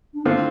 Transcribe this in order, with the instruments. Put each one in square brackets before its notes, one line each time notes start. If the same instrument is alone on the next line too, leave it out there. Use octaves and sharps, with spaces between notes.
[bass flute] D4
[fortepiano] D3 A3 C4 F4 [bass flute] E4